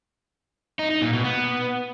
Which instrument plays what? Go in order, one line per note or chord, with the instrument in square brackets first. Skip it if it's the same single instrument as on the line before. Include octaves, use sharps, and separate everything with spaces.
[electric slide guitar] D#4
D#4
A#2
B2
B3